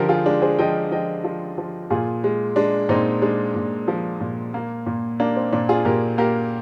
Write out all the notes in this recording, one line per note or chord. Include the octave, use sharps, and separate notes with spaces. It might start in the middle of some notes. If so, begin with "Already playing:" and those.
Already playing: D3 F3 G4 A#4
F4 G#4
G#3 D4
G#4 C5
F3 D#5 G5
F3 D#5 G5
F3
F3
A#2 F4 G#4
G#3
G#3 D4
A#2 C4 D#4
G#3 D4
A#2
F3
A#2
A#3
A#2
A#3 D4
C4
A#2 D4
F4 G#4
A#2 G4 A#4
A#3 G4 A#4